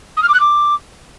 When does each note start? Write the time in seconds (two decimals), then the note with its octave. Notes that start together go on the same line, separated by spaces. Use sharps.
0.17 D#6
0.22 F6
0.28 D6
0.34 F#6
0.40 D6